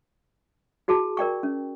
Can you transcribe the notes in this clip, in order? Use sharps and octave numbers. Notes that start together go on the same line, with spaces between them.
E4 F#4 G#4 A5
A#4 D5 G5 C#6
C#4